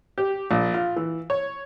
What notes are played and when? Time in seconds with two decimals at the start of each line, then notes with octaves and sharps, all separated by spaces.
0.18 G4
0.51 A#1
0.74 F4
0.96 E3
1.30 C#5